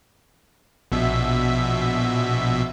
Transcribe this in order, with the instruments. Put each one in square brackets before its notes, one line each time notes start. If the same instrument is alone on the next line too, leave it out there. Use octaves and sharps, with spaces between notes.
[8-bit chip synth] A#1 B2 E5